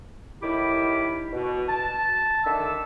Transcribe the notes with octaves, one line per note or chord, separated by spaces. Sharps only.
A2 D#3 E4 G4 B5 D6
B2
A5
D3 D#3 E5 E6